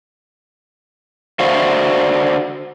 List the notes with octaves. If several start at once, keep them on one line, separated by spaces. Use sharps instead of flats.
D3 F#4 C5 D5 E5 F5